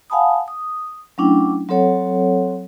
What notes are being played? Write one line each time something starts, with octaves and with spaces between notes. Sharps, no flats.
F5 F#5 G#5 A5 B5 D#6
D#6
F#3 A3 C#4 D4 E4 G5
F#3 C4 A4 C#5 F#5